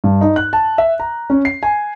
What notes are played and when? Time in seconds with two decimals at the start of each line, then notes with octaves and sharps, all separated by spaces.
0.04 G2
0.21 D#4
0.36 F#6
0.53 A5
0.78 E5
1.00 A#5
1.30 C#4
1.45 C7
1.63 G#5